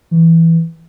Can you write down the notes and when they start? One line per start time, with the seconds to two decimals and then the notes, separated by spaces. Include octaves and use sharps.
0.11 E3